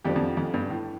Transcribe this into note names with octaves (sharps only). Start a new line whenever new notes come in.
F2 F3 D4 G4
F2
F2
G2
A2